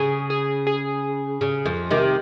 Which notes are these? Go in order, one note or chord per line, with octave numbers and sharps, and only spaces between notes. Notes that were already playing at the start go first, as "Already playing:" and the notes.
Already playing: C#3 G#4
G#4
G#4
C#3
F2
C3 D#3